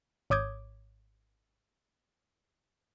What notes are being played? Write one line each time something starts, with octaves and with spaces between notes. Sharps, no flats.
G#1 C#5 D6 D#6 G6 G#6